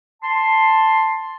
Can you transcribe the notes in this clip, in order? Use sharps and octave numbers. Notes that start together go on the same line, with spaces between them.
A5 C6